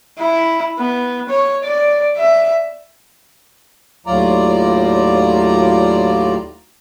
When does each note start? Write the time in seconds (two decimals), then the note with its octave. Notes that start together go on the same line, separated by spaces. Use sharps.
0.19 E4
0.78 B3
1.30 C#5
1.64 D5
2.18 E5
4.07 D#2 A2 F#3 F4 D5 A#5